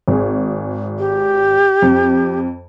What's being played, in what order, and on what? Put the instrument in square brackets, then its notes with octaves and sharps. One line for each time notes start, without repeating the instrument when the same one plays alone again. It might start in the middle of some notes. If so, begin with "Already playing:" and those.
[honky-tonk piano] G#1 G#4
[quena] G4
[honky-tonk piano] F2